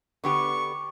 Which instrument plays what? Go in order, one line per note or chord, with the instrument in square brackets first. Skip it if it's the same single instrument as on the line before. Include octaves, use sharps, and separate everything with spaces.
[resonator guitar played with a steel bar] D3 B3 G4 [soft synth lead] C#6